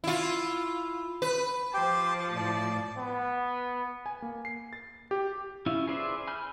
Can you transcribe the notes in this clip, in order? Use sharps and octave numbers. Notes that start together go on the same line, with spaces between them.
E4 F4
B4
F3 G4 C5 G5 A5
A2 D5
B3
G#5
A#3
C7
A6
G4
C#4 E4 F4
G#4 B4 C5 D5 E5
G#5 B5 F6 G6